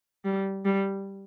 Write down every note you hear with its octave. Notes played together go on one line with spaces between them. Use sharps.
G3
G3